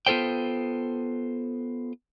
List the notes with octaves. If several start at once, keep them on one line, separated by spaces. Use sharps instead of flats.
B3 F4 A4 C5 G5